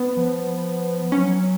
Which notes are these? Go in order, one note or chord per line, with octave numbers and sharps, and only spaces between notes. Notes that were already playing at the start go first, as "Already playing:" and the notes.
Already playing: B3
F3
F#3 C#4